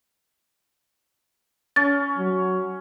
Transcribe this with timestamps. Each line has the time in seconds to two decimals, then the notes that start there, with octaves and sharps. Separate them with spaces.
1.76 C#4 A6
2.18 F#3